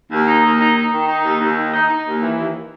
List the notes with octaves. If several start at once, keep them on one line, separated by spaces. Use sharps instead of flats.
D#2
D#4
D#2
D#4
D#4
D#3
D#4
D#2
D#2
D#3
D#4
D#4
D#2
E3
D#2